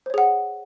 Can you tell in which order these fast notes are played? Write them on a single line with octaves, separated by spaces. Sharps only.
C5 C#5 G#4 F#5